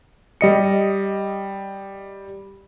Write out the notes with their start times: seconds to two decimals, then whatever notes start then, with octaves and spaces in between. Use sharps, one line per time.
0.41 G3 D#5 C#7